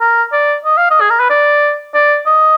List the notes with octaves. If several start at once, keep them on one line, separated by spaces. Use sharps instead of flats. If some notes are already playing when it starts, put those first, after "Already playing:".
A#4
D5
D#5
F5
D#5
G#4
A#4
B4
D5
D5
D#5